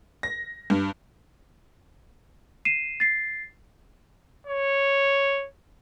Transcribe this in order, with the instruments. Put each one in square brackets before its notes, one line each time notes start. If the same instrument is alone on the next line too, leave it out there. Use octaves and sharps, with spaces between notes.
[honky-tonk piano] A#6
G2
[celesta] C7 D#7 E7
A6 C7
[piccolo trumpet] C#5